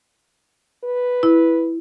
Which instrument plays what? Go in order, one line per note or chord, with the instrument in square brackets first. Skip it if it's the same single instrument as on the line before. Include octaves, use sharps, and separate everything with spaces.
[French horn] B4
[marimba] E4